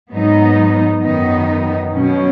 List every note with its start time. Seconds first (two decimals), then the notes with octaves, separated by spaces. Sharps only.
0.11 G#2 F#3 B3 D#4
1.01 F#2 D#3 B3 D#4
1.92 B2 F#3 C#4